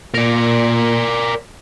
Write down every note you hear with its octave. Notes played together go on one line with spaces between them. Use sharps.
A#2 A#4 D5